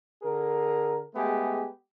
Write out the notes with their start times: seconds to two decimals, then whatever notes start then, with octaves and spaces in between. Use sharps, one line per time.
0.22 D3 G#4 A#4
1.15 G#3 A3 B3 G4 G#4